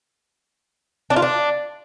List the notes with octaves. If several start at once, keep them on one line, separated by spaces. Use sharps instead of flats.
D4
F4
D4